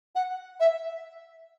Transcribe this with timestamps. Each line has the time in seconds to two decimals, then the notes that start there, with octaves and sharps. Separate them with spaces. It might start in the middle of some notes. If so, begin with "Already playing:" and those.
0.15 F#5
0.60 E5